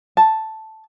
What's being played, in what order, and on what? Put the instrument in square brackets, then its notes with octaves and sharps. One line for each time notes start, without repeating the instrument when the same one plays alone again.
[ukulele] A5